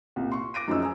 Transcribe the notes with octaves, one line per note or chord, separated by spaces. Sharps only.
C2 A#2
C6 C#6
D6 A#6 D7 D#7
F#2 F3 C#4 D#4 G#4 E6
G#5 A#5 D#6